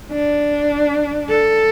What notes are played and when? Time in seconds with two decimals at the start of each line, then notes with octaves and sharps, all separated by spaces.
0.12 D4
1.29 A4